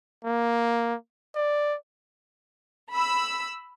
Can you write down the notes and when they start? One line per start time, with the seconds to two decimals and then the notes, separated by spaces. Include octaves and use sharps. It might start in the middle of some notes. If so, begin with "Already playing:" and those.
0.25 A#3
1.35 D5
2.94 B5 E6